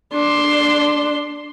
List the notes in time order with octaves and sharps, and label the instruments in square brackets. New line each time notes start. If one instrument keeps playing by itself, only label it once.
[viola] D4 C6